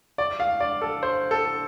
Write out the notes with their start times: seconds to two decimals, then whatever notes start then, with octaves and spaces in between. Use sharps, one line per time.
0.18 D5
0.40 F5
0.60 D5
0.81 A4
1.03 C5
1.31 A4